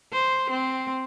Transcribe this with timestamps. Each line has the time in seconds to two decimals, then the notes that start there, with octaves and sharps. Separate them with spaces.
0.12 C5
0.50 C4